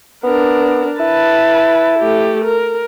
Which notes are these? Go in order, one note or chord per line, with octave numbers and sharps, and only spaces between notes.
B3 D4 A#4
E4 B4 A5
A3 G4
A#4